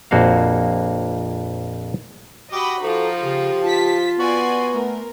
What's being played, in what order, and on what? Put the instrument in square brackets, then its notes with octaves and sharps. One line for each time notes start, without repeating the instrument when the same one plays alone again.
[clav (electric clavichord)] A#1 F2 A#3 F#4 C5 F5
[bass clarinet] F#4 [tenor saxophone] G4 [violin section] D#5 F#5 B5
[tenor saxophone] F3 [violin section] D#4 F4 [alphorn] A4
[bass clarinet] C#3 [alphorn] G4
[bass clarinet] F4 [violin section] A5 B6
[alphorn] B3 [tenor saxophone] F#4 [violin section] D5 G#5 C6
[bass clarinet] A3 [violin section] A#4